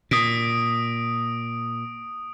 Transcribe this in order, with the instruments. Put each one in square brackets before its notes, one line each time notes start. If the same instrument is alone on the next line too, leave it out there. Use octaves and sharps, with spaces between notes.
[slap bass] A#2 [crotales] D#6 D7